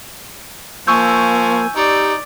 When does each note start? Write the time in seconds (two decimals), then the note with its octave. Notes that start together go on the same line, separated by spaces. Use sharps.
0.87 F3 A#3 G#5 C#6 E6 G6
1.76 D#4 G4 D5